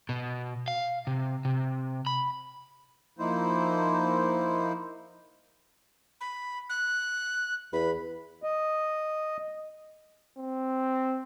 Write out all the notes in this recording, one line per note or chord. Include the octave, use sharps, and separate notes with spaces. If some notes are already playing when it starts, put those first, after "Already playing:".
B2
F5
C3
C3
B5
F3 A#3 D#4 E4 C5
B5
F#6
E2 B5
D#5
C4